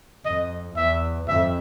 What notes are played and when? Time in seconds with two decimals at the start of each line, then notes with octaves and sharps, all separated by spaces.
0.25 F2 D#5
0.76 E2 E5
1.27 F2 E5